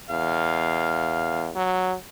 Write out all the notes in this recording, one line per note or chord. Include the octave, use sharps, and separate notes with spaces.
E2 F5
F#3